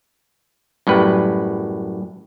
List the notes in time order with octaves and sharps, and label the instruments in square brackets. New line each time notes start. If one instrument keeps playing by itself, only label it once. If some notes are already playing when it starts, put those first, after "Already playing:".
[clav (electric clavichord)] F#2 A2 G3 B4